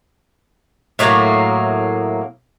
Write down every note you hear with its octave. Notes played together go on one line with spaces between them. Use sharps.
A2 F#3 A#3